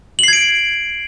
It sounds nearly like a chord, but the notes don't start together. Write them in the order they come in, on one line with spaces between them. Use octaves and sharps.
F#7 C7 G#6 D7